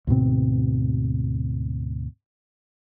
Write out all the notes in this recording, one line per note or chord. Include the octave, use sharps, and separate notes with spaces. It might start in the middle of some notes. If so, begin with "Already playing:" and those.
D2 G#2 B2 C4